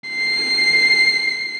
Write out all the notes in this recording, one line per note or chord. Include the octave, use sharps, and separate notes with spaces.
C7